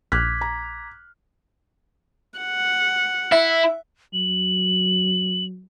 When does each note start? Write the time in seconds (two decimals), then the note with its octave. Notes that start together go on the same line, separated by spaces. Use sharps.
0.12 A#1 D6 F6 F#6 G#6 B6
0.41 A#5
2.39 F#5
3.32 E4 E5
4.13 F#3 F#7